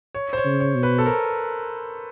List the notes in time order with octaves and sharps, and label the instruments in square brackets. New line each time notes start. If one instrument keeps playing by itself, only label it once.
[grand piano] C#5
C5
C#5
[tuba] C#3
[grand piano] C#5
[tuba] B2
[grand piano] B4
A4
A#4